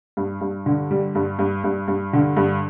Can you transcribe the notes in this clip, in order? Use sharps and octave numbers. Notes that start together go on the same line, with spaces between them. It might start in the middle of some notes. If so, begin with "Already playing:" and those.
G2
G2
D3
G3
G2
G2
G2
G2
D3
G2